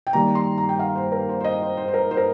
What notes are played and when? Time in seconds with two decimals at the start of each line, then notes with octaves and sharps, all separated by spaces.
0.07 G5
0.13 D#3 G3 A#3 A#5
0.35 C6
0.58 A#5
0.69 G5
0.79 F5
0.95 C5
1.12 A#4
1.29 C5
1.40 C5
1.44 D#5
1.62 C5
1.77 C5
1.88 C5
1.94 A#4
2.11 C5
2.17 A#4